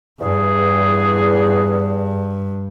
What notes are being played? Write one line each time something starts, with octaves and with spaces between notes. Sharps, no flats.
E2 G2 G#4